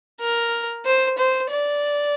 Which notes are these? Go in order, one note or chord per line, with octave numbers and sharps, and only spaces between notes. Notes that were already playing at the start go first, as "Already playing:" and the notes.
A#4
C5
C5
D5